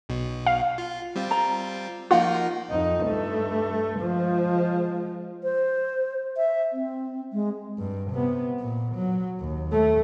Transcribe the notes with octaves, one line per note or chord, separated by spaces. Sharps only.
B1 B2
F5
F4
G3 C4 F4
A#5
F3 A#3 D#4 F4 F#5
F2 D#4
G2 A3
F3 G#3
C5
E5
C4
G#3
G2
C3 B3
A#2
F#3
D#2
A3